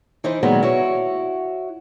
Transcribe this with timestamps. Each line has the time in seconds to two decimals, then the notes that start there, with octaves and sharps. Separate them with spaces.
0.24 E3 D#4 E4 C5
0.43 A#2 D#3 F#3 G#3 B3
0.63 E4 F#4 C#5